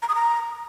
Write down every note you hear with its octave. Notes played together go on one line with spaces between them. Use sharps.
A#5
D#6
A#5